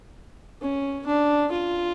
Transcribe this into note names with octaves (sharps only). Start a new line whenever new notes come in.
C#4
D4
F4